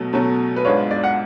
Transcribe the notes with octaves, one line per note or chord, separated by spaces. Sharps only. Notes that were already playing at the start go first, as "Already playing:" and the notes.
Already playing: B2 F#3 A3
B2 F#3 A3 C#4
B4
G#2 G#3 D4 F4 C#5
D5
F#5